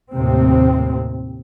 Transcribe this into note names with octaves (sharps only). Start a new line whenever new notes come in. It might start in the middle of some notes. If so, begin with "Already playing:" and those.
D#2 A2 C3 C4